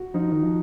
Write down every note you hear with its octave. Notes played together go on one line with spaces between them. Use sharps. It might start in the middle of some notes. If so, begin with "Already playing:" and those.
Already playing: F#4
F3 D#4
D#3
F3